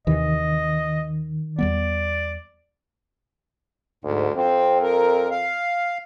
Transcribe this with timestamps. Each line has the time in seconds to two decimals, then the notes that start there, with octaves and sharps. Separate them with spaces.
0.07 D#2 C3 D#3 E3 D#5
1.59 E2 G3 B3 D5
4.04 D2 G#2
4.36 F2 C4
4.82 A#4
5.31 F5